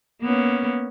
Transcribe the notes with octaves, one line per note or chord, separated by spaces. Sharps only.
A#3 B3 C#4